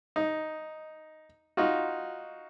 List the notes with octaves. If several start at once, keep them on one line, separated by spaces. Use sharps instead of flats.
D#4
D#4 F4 F#4